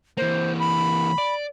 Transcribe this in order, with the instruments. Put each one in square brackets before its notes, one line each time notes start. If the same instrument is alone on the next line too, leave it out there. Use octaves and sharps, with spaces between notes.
[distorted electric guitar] E3 A#3 [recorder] C5
[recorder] B5
[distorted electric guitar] D5